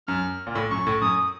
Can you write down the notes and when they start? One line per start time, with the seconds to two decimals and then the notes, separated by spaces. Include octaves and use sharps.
0.08 F#2 F6
0.47 A#2
0.55 A2
0.71 F#2 C#6
0.87 A2
1.01 F#2 D#6